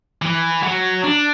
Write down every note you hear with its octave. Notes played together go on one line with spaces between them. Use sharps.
E3
F#3
D4